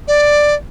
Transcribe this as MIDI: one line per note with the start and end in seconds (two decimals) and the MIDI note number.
0.08 0.54 74